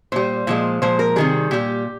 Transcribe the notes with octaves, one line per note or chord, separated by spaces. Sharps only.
A#2 G3 C5
A#2 F3 G#3
A#2 F3 G#3 C5
A#4
C3 D#3 G3 G#4
A#2 G3 G4